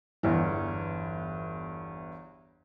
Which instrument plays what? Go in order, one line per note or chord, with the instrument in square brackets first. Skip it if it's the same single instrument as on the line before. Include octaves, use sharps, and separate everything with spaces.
[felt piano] G1 E2 E3